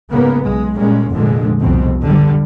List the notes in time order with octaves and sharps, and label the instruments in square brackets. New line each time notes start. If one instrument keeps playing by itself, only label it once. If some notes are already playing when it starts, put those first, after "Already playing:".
[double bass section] G#2 C#3 A#3 B3
B1 G#3
A#2 G3 G#3 A#3 C#4
F1 F2 A#2 D3 G#3
C2 F2 B2 C4
G2 D3 G3